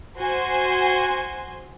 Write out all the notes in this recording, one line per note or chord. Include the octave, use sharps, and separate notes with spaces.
F#4 C5 G#5 C6